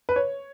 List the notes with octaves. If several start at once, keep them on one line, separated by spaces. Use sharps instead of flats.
B4
C#5